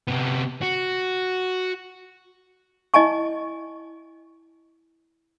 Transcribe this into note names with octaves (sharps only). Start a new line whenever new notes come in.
C3 B3
F#4
E4 D#5 G#5 A5 C#6